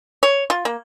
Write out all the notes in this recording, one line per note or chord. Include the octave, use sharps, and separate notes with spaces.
C#5
F4
A#3